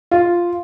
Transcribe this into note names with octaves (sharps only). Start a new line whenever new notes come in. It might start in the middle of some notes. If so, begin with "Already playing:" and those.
F4